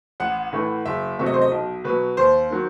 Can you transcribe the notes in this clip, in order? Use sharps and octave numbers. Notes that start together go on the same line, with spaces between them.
A1 F#5
A2 E3 A3
F#1 E5
E2 C3 F#3 A3 E5
D#5
C5
D#5
B1
B2 F#3 B4
D#2 C5
D#3 F#3